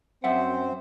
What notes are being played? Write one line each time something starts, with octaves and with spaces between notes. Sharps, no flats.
F#2 C4 C5 E5 F#5